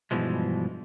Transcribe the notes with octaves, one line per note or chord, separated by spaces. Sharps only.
G2 B2 D3 E3 F3 G#3